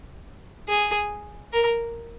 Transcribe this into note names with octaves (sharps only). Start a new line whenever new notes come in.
G#4
A#4